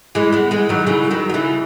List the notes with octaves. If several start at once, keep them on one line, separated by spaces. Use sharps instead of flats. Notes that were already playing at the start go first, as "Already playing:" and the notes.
E3 G#3
G#3 B3
E3 G#3
D#3 F#3
C#3 E3
D#3 F#3
F#3
C#3 E3